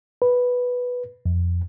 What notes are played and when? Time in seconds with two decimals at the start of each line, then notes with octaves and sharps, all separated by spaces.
0.22 B4
1.26 F2